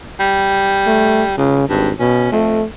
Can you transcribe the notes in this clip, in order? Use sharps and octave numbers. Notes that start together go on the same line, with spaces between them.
G3
A3
C#2 C#3
G#1 G2
B2 C#4
F2 A3